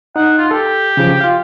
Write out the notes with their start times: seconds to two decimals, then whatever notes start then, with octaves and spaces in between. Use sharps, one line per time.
0.16 D#4 F#5
0.38 F4
0.51 G4 A4
0.97 C#3 F3
1.21 F4 F5